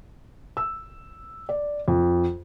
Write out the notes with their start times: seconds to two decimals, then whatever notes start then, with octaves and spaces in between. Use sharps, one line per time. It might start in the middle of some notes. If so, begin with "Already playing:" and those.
0.57 E6
1.49 D5
1.88 F2